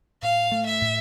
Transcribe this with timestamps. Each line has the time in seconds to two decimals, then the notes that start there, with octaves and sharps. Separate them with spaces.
0.22 A2 F5
0.52 A3
0.67 E5
0.81 A2